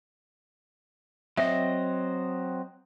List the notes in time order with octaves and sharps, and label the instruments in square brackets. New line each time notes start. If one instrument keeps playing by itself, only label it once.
[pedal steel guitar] F#3 C4 D#5 [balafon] E5